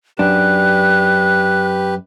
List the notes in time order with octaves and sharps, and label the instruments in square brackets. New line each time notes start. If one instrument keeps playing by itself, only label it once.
[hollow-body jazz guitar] F#2 D4 [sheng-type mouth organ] G4 B4 [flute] F#6